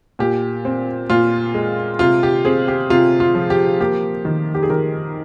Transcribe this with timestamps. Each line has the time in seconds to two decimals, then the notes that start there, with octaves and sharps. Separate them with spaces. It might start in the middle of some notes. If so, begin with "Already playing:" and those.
0.19 A#2 G4
0.65 C4
1.10 A#2 F4
1.54 G#3
1.99 C3 F4
2.23 G4
2.45 C4 G#4
2.68 G4
2.90 C3 F4
3.20 F4
3.35 F3
3.50 G4
3.80 A#3 G4
4.25 D#3
4.55 G4
4.63 G#4
4.70 D#3 A#4